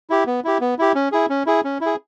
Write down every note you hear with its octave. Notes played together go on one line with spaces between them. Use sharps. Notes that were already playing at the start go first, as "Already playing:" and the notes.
E4 G4
B3
E4 G4
B3
E4 G4
C#4
E4 G#4
C#4
E4 G#4
C#4
E4
G#4